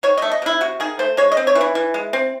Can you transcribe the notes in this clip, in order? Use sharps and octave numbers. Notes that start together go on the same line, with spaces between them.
D#3 C#5
D#5
A3
D#5
C3 E4
C3 F#4
D#3 G#4
A3 C5
G#3 C#5
D#5
C4
C#5
E3
E4
E3
G#3
C4